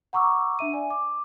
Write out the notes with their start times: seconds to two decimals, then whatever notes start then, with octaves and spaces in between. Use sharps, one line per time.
0.13 F#5 A#5 C#6 D6 E6
0.59 D4 E5 D#7
0.73 D5 G#5
0.90 D6